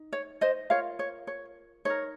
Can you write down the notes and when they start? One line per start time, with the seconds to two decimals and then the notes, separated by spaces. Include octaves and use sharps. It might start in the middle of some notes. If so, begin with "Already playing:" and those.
Already playing: D#4
0.13 C#5
0.41 C5 D#5
0.70 F4 A#4 C#5 F5
0.99 C#5
1.27 C#5
1.85 D#4 A#4 C#5